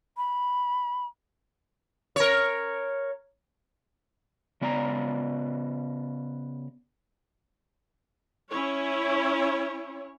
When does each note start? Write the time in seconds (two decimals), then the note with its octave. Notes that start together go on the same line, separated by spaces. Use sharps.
0.17 B5
2.16 A#4 C#5
4.61 C#3 B3 D5 G#5 A#5
8.50 C#4 E4 C#5